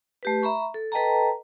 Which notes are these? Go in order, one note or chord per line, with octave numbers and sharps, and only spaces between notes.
A3 G4 B4
E5 A#5 B5 C#6
A4
A4 B4 D#5 G5 A5 A#5